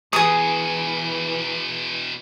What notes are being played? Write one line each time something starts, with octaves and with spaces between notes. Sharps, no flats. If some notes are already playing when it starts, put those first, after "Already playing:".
E2 B2 E3 G#4 D#6